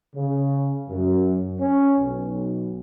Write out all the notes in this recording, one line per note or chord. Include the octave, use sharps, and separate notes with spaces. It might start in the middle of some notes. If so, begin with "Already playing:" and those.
C#3
F#2
C#4
B1